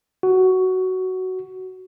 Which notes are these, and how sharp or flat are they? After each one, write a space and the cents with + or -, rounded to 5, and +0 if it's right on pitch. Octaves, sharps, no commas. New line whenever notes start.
F#4 +10